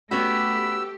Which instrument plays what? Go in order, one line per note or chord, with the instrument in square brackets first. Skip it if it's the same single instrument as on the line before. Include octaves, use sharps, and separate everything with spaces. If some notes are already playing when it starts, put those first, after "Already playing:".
[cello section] A3 G4 [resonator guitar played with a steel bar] B3 C#4 F#4 [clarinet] B5 [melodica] E6